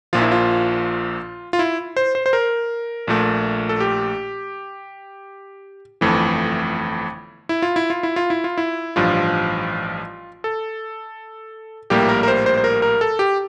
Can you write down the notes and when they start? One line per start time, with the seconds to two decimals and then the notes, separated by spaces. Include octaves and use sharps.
0.13 A#1 A#2 F3 F4
0.21 E4
0.32 F4
1.53 F4
1.59 E4
1.97 C5
2.15 C5
2.26 C5
2.33 A#4
3.07 A#1 A#2 A3
3.69 A4
3.80 G4
6.01 G1 F2 E3 A3
7.49 E4
7.62 F4
7.76 E4
7.90 F4
8.03 E4
8.16 F4
8.30 E4
8.44 F4
8.58 E4
8.96 A1 G2 F3 F4
10.44 A4
11.90 A#1 A2 G3 A#3 G4
12.09 A#4
12.23 A#4
12.28 C5
12.46 C5
12.57 C5
12.64 A#4
12.82 A#4
13.01 A4
13.19 G4